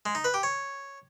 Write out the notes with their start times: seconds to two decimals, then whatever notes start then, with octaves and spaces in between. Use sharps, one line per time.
0.06 G#3
0.15 D#4
0.24 B4
0.34 G4
0.43 C#5